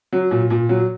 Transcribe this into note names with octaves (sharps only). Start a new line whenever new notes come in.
F#3
A#2
A#2
F#3